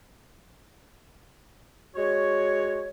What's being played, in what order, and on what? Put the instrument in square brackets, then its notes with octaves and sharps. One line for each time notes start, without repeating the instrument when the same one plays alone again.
[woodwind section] G#3 F#4 C#5